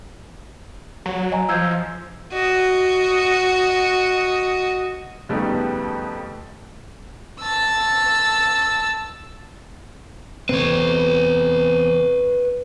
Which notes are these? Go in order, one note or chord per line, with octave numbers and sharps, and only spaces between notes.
F#3
D#5 G#5 A#5
F3 E6 G6 G#6
F#4 D#5
F2 C#3 G3 A3 B3 D#4
A5 E6
E2 C3 C4 B4 C#5